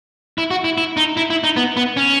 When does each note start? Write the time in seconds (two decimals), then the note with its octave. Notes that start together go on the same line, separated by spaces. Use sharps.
0.38 E4
0.50 F#4
0.64 E4
0.78 E4
0.97 D#4
1.17 E4
1.30 E4
1.44 D#4
1.57 B3
1.77 B3
1.97 C#4